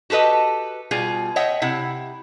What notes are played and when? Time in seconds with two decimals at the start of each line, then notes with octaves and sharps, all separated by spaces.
0.10 F#4 G4 A4 B4 D#5
0.91 B2 G3 F4 G#4
1.36 C#5 D#5 E5 F#5 G5
1.62 C3 E4 F#5